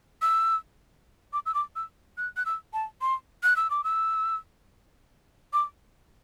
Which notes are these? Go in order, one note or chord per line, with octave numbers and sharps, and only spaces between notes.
E6
D6
E6
D6
E6
F#6
F#6
E6
A5
C6
F#6
E6
D6
E6
D6